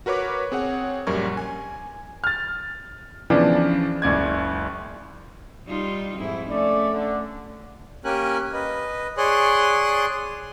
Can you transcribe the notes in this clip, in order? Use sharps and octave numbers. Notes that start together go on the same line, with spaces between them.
F#4 A#4 B4 C#5 D6
C4 G#4 C#5 F#5
A#1 F#2 G3 A#4 C#6 G#6
G#5
F6 A6
C#3 E3 F3 B3 D4
F#1 C#2 D5 G#6
G3 D#4 F4
F2 G#2 E4
A3 C#4 D5
D3
A#3 C#4 G4 A#4 G#5 F#6
B4 D#5
G#4 C#5 D5 C6 D#6 F#6